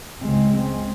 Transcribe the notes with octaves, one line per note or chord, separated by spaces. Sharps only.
C#2 C#3 G#3 C4
G#3 C4